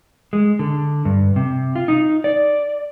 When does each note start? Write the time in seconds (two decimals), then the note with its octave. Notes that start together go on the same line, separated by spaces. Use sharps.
0.33 G#3
0.59 D3
1.05 G2
1.36 C3
1.76 F4
1.88 D#4
2.24 D5